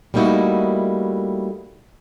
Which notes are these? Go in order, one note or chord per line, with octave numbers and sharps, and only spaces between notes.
G3 A3 A#3 D#4 E4 F#4